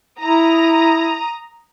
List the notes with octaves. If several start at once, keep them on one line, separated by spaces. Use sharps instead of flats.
E4 A#5 D#6